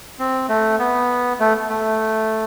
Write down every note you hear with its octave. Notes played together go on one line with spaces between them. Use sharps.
C4
A3
B3
A3
A3